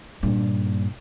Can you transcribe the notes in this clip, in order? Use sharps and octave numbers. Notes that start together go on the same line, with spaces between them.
G2 A#2